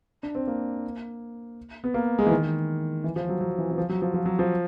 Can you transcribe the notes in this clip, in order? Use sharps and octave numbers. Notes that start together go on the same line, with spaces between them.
D4
C4
A#3
B3
A#3
G#3
E3
D#3
E3
F3
F#3
F#3
E3
E3
F3
F#3
F3
F3
F#3
F3